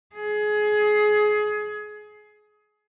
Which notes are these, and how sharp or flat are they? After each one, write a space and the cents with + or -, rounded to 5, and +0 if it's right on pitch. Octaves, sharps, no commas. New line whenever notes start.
G#4 +20